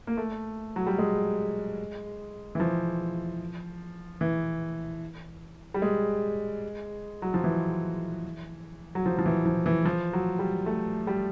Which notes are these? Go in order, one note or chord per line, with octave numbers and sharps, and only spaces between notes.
A#3
A3
F#3
G3
G#3
E3
F3
E3
G3
G#3
F#3
F3
E3
F#3
F3
F3
E3
F3
E3
F3
F#3
G3
A3
G3